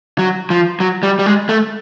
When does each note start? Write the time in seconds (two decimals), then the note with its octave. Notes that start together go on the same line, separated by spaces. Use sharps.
0.18 F#3
0.50 F3
0.80 F#3
1.03 G3
1.19 G3
1.26 G#3
1.49 A3